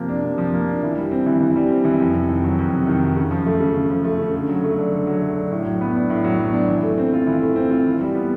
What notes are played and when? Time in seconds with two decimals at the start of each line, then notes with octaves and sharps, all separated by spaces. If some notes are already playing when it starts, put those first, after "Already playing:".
Already playing: C3 F3 A#3
0.09 D4
0.24 C3
0.38 F3
0.54 A#3
0.68 D4
0.83 E3
0.97 G3
1.11 C4
1.26 E3
1.41 E3
1.56 G3
1.70 C4
1.85 E3
1.99 F2
2.14 C3
2.29 D#3
2.44 F#3
2.59 F2
2.73 C3
2.87 D#3
3.02 F#3
3.16 C#3
3.31 F3
3.46 A3
3.60 C#3
3.76 C#3
3.90 F3
4.04 A3
4.19 C#3
4.34 D3
4.49 F#3
4.64 A3
4.78 D4
4.92 D3
5.07 F#3
5.22 A3
5.36 D4
5.52 A2
5.66 F#3
5.81 B3
5.95 D4
6.10 A2
6.24 F#3
6.39 B3
6.53 D4
6.69 E3
6.83 A3
6.98 C4
7.13 F4
7.27 E3
7.42 A3
7.56 C4
7.71 F4
7.86 E3
8.01 G3
8.15 B3